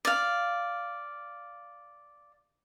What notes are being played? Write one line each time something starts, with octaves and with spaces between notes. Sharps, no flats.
D5 F5